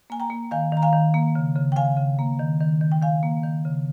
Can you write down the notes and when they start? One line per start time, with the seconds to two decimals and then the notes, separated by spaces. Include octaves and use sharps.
0.10 A#3 G#5
0.20 G5 A#5
0.30 A#3
0.51 D#3 F5 G#5
0.72 D#3 A#5
0.82 F5 G#5
0.93 D#3
1.14 A#3
1.35 C#3
1.56 C#3
1.72 G5
1.76 C#3 F5 G#5
1.97 C#3
2.19 A#3
2.39 D#3
2.61 D#3
2.81 D#3
2.92 G5
3.02 D#3 F5 G#5
3.23 A#3
3.43 D#3
3.65 C#3